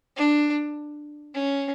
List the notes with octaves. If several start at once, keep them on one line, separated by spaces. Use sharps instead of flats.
D4
C#4